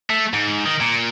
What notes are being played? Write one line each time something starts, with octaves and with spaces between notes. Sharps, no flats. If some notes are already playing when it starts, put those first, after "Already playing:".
A3
G#2
D#3
A#2